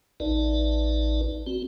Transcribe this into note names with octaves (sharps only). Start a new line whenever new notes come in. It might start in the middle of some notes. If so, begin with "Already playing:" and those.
A1 D#4 B4 D5
C4 F#4